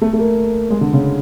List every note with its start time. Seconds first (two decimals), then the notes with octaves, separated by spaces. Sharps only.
0.01 A3
0.13 A3
0.19 A#3
0.70 G#3
0.81 D3
0.93 C#3